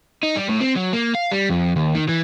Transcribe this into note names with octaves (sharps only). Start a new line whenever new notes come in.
D#4
G3
A2
C4
F#3
A#3
F5
G3
F2
D#2
D#3
E3